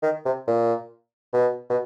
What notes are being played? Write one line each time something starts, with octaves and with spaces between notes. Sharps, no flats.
D#3
C3
A#2
B2
B2